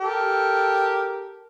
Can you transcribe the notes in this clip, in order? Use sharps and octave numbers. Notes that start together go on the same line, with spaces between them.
G4 A4 A#4